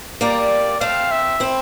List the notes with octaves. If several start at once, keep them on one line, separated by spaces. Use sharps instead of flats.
G3 A#3 D5
A3 C4 F5
E5
C4 E4